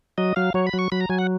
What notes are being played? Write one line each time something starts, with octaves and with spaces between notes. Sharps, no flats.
F#3 D#5
F#3 F5
F#3 C#5
B5
F#3
C#6
F#3 B5
A#5
F#3 G#5
F#5